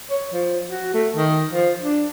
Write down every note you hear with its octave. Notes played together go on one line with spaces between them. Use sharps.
C#5
F3
F#4
A3
D#3
F3
D4